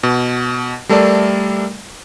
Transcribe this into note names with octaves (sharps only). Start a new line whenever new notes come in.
B2
G3 A3 A4 A#4 D5